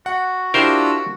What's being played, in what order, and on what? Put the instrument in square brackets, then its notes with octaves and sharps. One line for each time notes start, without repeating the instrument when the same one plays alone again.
[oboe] F#4 [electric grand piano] F#5
[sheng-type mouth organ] D4 F4 E6 [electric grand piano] E4 G4 [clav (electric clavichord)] A#4 C5